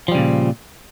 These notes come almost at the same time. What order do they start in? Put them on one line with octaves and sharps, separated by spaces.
F3 G3 C#3 A#2